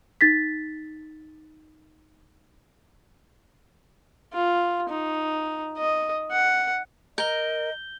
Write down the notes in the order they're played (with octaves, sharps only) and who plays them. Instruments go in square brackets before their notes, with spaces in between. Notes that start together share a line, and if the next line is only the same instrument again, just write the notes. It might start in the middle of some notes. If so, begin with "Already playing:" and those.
[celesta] D#4 A6 B6
[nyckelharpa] F4
D#4
D#5
F#5
[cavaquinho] A#4 [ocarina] D#5 [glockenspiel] G6 G7